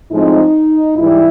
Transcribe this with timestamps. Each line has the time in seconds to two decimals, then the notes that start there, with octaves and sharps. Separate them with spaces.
0.11 A2 F3 G#3 C4 D#4
0.97 G#2 E3 G3 E4